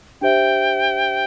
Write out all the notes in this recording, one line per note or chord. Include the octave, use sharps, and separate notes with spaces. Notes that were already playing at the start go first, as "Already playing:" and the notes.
D4 G4 C5 E5 G5